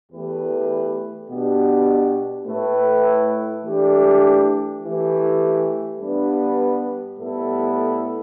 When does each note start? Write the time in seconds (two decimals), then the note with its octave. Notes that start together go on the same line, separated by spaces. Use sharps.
0.11 E2 E3 A3 G4 B4
1.30 B2 B3 D4 G4
2.47 A2 A3 E4 B4
3.64 E3 A3 D4 G4
4.82 E3 A3 G4
6.00 G2 G3 B3 D4 B4
7.18 A2 G3 B3 E4 A4